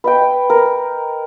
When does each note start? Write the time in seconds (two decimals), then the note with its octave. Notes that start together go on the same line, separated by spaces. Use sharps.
0.04 B4 D#5 G5
0.50 A#4